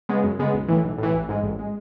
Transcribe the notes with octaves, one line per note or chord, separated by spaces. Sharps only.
C#3 G#3 B3
F#2
C#3 G#3 B3
B1
A2 E3
B1
A2 E3
A1
G#2 G#3
A1
G#3